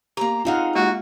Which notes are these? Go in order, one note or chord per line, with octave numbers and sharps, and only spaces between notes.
A#3 G4 A#5
C4 D#4 F4 G#4 F5 F#5
G#3 A#3 F#4 G4